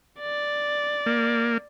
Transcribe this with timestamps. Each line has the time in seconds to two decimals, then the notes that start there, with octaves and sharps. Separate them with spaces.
0.20 D5
1.06 A#3